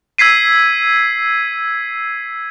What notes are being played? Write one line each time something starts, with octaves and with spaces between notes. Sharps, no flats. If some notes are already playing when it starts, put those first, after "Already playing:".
E6 G#6 B6 C7 D#7